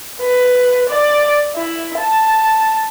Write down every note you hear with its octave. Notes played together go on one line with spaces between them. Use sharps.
B4
D5
E4
A5